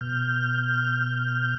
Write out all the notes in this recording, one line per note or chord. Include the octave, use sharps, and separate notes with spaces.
B2 F6 G6